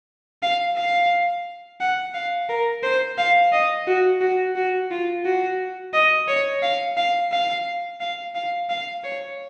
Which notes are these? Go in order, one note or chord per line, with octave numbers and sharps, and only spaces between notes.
F5
F5
F#5
F5
A#4
C5
F5
D#5
F#4
F#4
F#4
F4
F#4
D#5
C#5
F5
F5
F5
F5
F5
F5
C#5